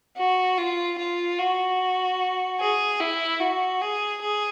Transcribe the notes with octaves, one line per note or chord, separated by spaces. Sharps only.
F#4
F4
F4
F#4
G#4
E4
F#4
G#4
G#4